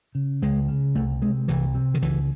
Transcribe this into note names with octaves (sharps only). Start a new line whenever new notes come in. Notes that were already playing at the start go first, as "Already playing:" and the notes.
C#3
C#2 G#3
C#3
C2 A3
C3 G#3
C2 E3
C3
D#3
C#2 E3